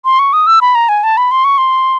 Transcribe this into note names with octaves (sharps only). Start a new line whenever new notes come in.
C6
C#6
D#6
E6
B5
A#5
G#5
A5
B5
C6
C#6
C6